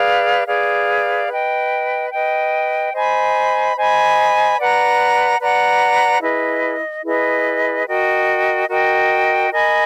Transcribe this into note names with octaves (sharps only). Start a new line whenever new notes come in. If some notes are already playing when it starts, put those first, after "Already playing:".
Already playing: G#4 B4 D5 F5
G#4 B4 D5 F5
B4 D#5 G5
B4 D#5 G5
C5 D#5 G#5 B5
C5 D#5 G#5 B5
B4 D5 F#5 A#5
B4 D5 F#5 A#5
E4 G#4 B4 D#5
E4 G#4 B4 D#5
F#4 A#4 D#5 G5
F#4 A#4 D#5 G5
A#4 D#5 G#5 B5